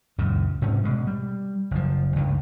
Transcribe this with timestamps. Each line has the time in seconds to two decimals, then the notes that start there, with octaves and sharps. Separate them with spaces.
0.18 C#2 F#2 A#2 C#3
0.62 G#2 C3 G3 C#4
0.84 B2 G#3
1.07 G3
1.71 F#1 F3
2.16 C#2 G2